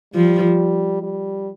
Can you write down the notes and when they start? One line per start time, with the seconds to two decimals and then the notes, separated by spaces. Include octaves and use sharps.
0.14 F3 G3
1.02 G3